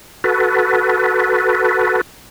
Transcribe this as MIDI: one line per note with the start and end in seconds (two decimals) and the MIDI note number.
0.24 2.01 66
0.24 2.01 69
0.24 2.01 71